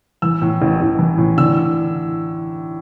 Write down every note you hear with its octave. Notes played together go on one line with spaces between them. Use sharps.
E3 E6
A2
A1
A1
E3
A2
D3 E6